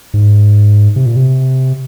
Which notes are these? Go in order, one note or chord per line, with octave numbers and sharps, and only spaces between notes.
G#2
C3
A#2
C3